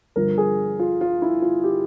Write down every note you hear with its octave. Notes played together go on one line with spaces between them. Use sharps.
G1 G2 F3 A#4
G#4
F4
F4
E4
F4
G4